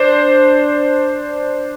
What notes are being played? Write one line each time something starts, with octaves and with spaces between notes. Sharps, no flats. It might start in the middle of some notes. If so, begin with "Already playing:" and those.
Already playing: D4 C5